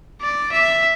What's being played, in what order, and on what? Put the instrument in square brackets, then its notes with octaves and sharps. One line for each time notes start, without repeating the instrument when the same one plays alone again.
[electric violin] D5
E5